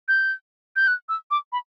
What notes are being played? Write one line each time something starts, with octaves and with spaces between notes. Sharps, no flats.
G6
G6
F#6
E6
D6
B5